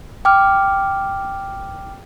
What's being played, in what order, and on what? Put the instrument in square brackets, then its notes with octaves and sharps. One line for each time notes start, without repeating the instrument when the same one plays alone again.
[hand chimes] G5 D6 F6